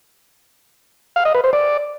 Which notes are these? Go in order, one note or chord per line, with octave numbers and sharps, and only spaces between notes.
F5
D#5
B4
C5
D5